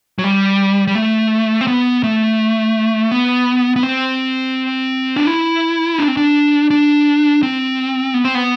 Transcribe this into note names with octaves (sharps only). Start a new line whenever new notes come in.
F#3
G3
G3
A3
C4
B3
A3
B3
B3
C4
D4
E4
D4
C4
D4
D4
C4
B3
C4
B3